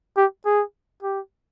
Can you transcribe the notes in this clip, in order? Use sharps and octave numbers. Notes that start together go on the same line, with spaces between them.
G4
G#4
G4